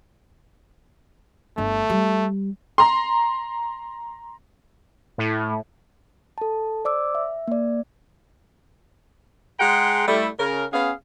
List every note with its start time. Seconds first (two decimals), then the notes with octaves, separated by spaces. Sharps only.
1.58 G1 A3 D4
1.90 G3
2.78 A#5 C6
5.18 A2
6.38 A4 A5
6.85 C5 D5 D6 E6
7.15 E5
7.48 A#3 D5
9.60 G#3 G#4 F#5 G5 A#5 C6
10.07 G3 A3 E4
10.39 C#3 A#4
10.73 B3 C#4 G#4 F5